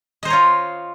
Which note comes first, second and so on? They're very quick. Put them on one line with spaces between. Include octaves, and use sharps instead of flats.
D#5 C5 A#5 C#5 F4